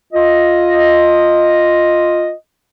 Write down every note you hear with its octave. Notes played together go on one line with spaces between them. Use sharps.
F4 D#5